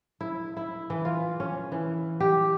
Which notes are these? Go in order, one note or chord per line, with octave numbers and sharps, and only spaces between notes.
E4
E4
E3
F4
C#4
E3
G4